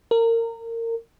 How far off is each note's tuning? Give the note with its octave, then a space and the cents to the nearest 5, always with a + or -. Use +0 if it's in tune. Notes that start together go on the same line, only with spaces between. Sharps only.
A#4 -25